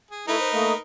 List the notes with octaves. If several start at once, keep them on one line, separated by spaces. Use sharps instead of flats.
G#4
A3 D#4 E4 A#4 B4
C5
A3 A#3 D#5